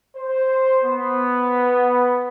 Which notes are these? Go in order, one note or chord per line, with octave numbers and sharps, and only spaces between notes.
C5
B3